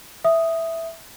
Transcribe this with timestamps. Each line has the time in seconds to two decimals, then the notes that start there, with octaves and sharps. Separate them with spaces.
0.25 E5 D#6